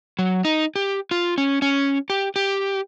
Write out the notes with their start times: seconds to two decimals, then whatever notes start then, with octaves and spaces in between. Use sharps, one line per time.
0.19 F#3
0.45 D#4
0.76 G4
1.11 F4
1.38 C#4
1.62 C#4
2.10 G4
2.36 G4